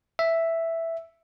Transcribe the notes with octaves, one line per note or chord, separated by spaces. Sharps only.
E5